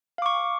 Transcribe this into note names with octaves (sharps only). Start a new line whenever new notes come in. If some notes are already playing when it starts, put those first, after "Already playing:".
F5 C#6 D6